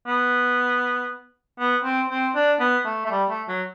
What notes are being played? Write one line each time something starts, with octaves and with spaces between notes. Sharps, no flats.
B3
B3
C4
C4
D4
B3
A3
A3
G3
A3
F#3